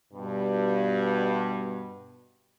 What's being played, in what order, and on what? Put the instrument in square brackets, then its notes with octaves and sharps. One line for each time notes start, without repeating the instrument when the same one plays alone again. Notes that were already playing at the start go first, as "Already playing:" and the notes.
[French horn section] G2 B2